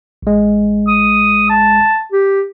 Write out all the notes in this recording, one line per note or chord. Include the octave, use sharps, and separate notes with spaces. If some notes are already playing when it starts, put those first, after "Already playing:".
A1 G#3
D#6
A5
G4